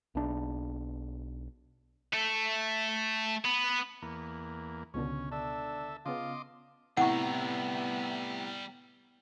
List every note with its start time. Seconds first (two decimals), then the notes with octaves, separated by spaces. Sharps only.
0.15 B1 D4
2.14 A3
3.45 B3
4.02 E2 A#3
4.94 C#2 B2 D3 C#4
5.32 D4 A4 E5
6.06 C#3 B3 F4 D#5 C6 D6
6.97 A2 C3 G3 B3 E4 F#5 A#5 C#6